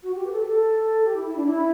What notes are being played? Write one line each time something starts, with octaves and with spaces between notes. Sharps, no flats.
F#4
G4
B4
A4
G4
A4
G4
E4
E4
D4
E4